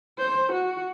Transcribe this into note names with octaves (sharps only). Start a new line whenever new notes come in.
C5
F#4